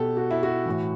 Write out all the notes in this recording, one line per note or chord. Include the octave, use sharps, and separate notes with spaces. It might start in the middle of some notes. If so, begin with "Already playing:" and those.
Already playing: B2 G4 A4
F#4
E4
F#4
A2 E3